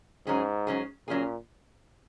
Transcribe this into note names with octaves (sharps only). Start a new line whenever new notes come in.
G#2 F#3 C#4 G#4
F#3 C#4 G#4
A#2 F#3 C#4 G#4